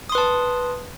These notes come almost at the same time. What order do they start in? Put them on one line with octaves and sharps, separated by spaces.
D#6 C6 B4 A5